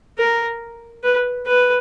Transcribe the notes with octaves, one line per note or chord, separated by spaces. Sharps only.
A#4
B4
B4